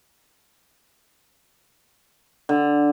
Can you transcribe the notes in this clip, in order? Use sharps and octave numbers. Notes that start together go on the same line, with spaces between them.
D3